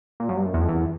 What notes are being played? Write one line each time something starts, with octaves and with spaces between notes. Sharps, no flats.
A#2
F#2
G2
F#2
E2
F2
E2